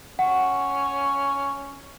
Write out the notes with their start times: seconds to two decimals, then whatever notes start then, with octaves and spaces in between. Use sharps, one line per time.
0.19 C#4 F#5